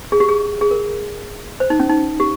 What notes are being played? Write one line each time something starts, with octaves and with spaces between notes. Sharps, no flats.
G#4
G4
G#4
G#4
A#4
C5
D#4
C#4
D#4
G4